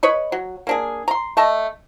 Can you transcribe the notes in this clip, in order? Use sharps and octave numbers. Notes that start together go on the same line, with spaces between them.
B4 C#5 D#5 B5
F#3
A#3 D4 G#4
A#5 C6
A3 D#5 A5